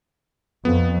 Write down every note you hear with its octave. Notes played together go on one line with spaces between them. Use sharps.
F2 B3